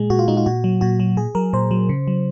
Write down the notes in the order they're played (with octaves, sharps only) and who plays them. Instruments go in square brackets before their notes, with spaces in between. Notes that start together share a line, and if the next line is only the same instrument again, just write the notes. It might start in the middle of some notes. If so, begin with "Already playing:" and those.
Already playing: [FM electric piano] A#2 G#3 G#4
A#2 F#4
F4
G#3 D#4
F4
A#2 F#4
F#3
A#2 F#4
F#3
A#2 G#4
F#3 A#4
A#2 C5
F#3
C#3
F#3